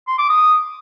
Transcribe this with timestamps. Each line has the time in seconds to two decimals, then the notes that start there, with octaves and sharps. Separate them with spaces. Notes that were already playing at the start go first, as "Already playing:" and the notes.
0.07 C6
0.18 D6
0.29 D#6